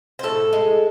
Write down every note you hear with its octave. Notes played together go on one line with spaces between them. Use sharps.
C5
A2 A4
G#3